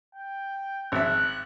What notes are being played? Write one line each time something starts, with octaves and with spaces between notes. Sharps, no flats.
G5
G#1 E5 F#6